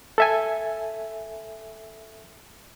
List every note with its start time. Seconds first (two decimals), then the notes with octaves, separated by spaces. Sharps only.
0.18 A4 E5 G#5